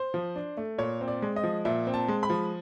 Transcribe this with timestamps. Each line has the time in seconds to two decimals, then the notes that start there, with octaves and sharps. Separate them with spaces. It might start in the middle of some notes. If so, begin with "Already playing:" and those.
Already playing: C5
0.14 F3
0.36 D4
0.57 A3
0.78 A#2 C#5
1.01 C4
1.08 D5
1.22 G#3
1.36 D#5
1.44 F3
1.65 A#2 E5
1.87 C4
1.94 A5
2.08 G#3
2.23 B5
2.30 F3